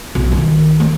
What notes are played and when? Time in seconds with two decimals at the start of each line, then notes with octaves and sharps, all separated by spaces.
0.15 B1
0.32 D#3
0.80 A#3